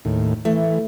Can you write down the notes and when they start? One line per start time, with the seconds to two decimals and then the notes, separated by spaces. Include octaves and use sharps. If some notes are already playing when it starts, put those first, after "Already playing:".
0.05 D#2 A2
0.45 E3 A3